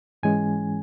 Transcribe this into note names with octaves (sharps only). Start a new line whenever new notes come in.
G#2 E3 G#3 C#4 G#5